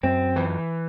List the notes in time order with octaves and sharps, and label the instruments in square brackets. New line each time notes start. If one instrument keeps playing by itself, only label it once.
[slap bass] F#2 [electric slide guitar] C4
[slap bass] E3